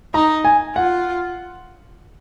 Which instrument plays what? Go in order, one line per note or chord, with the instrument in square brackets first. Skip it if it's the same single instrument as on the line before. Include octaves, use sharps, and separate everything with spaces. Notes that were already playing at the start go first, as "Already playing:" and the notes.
[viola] D#4 [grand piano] A#5
[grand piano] G#5
[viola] F4 [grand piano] F#5